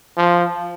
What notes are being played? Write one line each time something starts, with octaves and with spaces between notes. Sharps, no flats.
F3